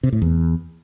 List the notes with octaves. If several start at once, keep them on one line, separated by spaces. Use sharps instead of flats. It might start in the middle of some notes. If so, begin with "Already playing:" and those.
C3
A2
E2